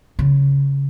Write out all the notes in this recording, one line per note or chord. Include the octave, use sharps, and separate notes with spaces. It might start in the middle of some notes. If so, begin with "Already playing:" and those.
C#3